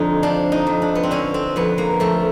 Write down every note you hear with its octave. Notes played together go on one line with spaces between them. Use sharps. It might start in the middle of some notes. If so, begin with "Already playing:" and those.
Already playing: F2 D3 D#4
F3 D4
D#4
F2
D4
B3
C4
D3 C#4
C4
F2 B3
A#3
F3 A3